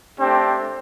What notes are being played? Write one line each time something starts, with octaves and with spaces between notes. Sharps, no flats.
A3 C4 D4 G4